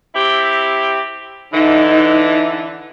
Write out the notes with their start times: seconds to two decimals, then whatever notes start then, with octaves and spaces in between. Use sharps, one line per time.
0.15 C4 E4 G4
1.52 D3 E3 D#4